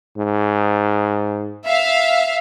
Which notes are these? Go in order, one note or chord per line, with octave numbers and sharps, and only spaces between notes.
G#2
E5 F5